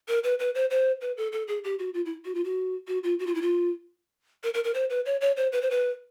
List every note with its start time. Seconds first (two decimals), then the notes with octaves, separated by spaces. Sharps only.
0.08 A#4
0.24 B4
0.39 B4
0.55 C5
0.70 C5
1.01 B4
1.17 A4
1.32 A4
1.48 G#4
1.64 G4
1.79 F#4
1.94 F4
2.06 E4
2.25 F#4
2.35 F4
2.44 F#4
2.88 F#4
3.04 F4
3.19 F#4
3.27 F4
3.35 E4
3.42 F4
4.44 A#4
4.54 A#4
4.64 A#4
4.74 C5
4.90 B4
5.06 C#5
5.21 C#5
5.37 C5
5.52 B4
5.62 C5
5.71 B4